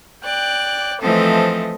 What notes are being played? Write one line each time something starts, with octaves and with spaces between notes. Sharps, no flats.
D5 G5 F#6
E3 F3 A3 C4 A4 D#5